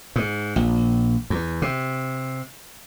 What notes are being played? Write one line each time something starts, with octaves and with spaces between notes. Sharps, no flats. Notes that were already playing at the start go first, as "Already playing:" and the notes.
G#2
A#1
E2
C3